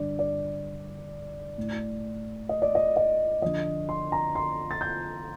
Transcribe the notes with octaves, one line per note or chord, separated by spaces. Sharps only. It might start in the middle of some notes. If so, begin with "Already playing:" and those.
Already playing: G2 D3 D5
D5
A2
D#5
D5
D#5
D#5
F2 D3 D#5
C6
A#5
C6
A6
G6